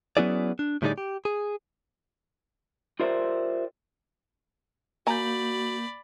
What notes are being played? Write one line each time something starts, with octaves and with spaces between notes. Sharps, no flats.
F#3 B3 C#4 E4 G#4 D5
D4
A2 D3 G3 D#4 G#4 D5
G4
G#4
F4 G4 A#4 C5 D5 E5
A#3 F#4 D5 G#5 A#5 B5 G6